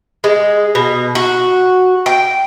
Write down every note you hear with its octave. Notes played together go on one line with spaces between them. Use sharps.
G#3
B2
F#4
G5